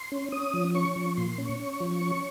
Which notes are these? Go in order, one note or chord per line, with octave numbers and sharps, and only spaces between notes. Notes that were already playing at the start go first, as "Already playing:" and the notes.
Already playing: C6
C#4
C#4 D#6
F3
C#4 C#6
F3
A#2 C6
C#4
C#6
C#4
C#6
F3
C#4